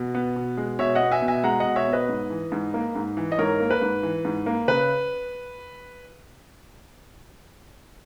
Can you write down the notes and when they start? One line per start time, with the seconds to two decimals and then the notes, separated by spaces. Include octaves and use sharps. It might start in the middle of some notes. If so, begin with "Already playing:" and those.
Already playing: B2
0.15 B3
0.36 B2
0.57 G#3
0.79 B2 C#5 E5
0.95 D#5 F#5
1.01 B3
1.11 E5 G#5
1.22 B2
1.28 E5 G#5
1.43 G#3 F#5 A#5
1.60 D#5 F#5
1.65 B2
1.76 C#5 E5
1.88 B3
1.93 B4 D#5
2.09 G#2
2.30 E3
2.52 G#2
2.74 A#3
2.95 G#2
3.17 E3
3.32 D#5
3.38 G#2 A#4 C#5
3.60 A#3
3.70 B4
3.82 G#2
4.03 E3
4.25 G#2
4.46 A#3
4.68 C#3 B4